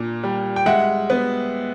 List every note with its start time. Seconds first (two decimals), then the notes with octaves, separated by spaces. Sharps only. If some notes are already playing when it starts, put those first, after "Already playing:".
Already playing: A#2 A#3 D4
0.23 G3
0.56 G5
0.66 G#3 E5 F#5
1.10 B3